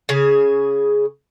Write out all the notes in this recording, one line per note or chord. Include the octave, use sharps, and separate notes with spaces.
C#3 G#4